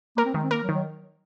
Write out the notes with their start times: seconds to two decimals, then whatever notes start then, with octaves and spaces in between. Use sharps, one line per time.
0.17 A#3 A#4
0.25 C4
0.34 D#3 G#3
0.43 C4
0.51 A#3 A#4
0.63 F#3
0.69 D#3
0.74 F#3